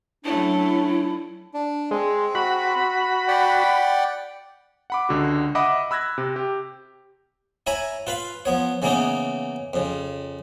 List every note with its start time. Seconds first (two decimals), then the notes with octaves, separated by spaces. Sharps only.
0.25 F#3 A3 C#4 D4 E4
1.54 D4
1.91 G#3 C4
2.35 F#4 B5
3.28 D5 F#5 G5
4.90 F#5 B5 D6
5.09 C#2 D3 F#4
5.55 D#5 E5 F#5 B5 D6 D#6
5.91 B5 E6 F#6 G#6 A#6
6.18 C3
6.36 G4
7.67 E4 C#5 G#5 A#5 B5
8.07 F4 B4 F5 B5
8.45 F3 B3 C#5
8.82 C#3 E3 A#3 B3 C#4 D#4
9.74 F2 C#3